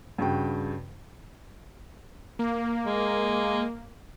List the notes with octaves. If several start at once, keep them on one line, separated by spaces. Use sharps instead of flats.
G2 C#3 F#4 G5
A#3
G#3